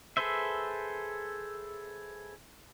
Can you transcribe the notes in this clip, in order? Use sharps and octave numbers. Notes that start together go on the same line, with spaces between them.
G#4 A4 B4 C5 E5